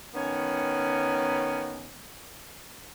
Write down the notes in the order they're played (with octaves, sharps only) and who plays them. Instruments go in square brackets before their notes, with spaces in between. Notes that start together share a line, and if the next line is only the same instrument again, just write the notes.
[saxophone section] D#3 B3 C#4